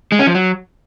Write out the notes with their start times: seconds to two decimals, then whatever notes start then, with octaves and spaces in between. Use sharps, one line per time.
0.12 G#3
0.19 C#4
0.27 F3
0.34 F#3